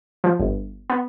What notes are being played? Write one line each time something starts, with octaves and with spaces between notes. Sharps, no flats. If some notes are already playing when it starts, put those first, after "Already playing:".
F3
G1
B3